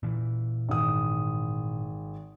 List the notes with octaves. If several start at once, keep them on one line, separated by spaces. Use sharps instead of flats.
A#2 E3
G#1 D#6